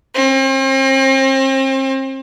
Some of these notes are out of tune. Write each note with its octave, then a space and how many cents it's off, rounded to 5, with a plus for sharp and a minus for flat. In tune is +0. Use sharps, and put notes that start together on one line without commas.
C4 +40